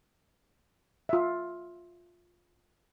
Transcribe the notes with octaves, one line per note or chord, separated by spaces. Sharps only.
F4 E5